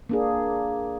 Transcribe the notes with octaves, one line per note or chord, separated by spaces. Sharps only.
A#3 D4 G#4